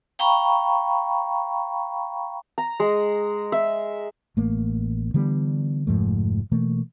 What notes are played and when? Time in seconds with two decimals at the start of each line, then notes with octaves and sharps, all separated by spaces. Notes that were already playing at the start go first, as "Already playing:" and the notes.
0.19 F5 G5 A#5 B5 C#6
2.58 A#5
2.80 G#3
3.52 E5
4.37 A1 A3 A#3
5.14 D3 E3 G3 B3
5.87 F1 G#2 F3 A3
6.51 B2 E3 A3 A#3